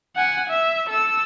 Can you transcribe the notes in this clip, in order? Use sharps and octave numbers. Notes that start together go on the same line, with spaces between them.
F#5 G#5
E5
A4 E6